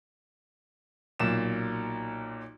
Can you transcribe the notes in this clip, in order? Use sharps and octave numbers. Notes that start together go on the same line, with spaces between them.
B1 A#2 E7